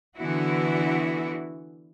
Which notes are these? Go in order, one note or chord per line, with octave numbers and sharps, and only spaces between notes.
D3 E3 B3 E4 F#4